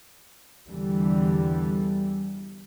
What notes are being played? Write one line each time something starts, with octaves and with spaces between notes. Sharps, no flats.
E2 D3 E3 G3